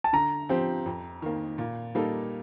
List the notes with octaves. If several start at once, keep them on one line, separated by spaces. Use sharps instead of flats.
A5
D3 A#5
F3 C4 G4
F2
D#3 A#3
A#2
G3 A#3 D#4 A4